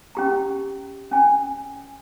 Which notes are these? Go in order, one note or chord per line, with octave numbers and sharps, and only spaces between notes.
C#4 G4 A#5
C#4 G#5